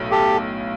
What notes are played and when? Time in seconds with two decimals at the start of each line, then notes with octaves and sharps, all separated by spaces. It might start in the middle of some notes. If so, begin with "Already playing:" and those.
Already playing: B1 A2 F#3 A3
0.11 G4 A4